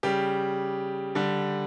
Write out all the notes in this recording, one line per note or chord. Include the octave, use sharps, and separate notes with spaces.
C#3 G3 G4
D3 G3